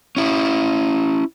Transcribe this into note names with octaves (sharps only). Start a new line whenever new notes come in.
C#4 E4